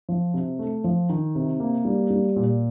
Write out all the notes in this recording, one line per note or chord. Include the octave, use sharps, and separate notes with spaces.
F3
C3
A3
F3
D#3
C3
A#3
G3
G3
A#2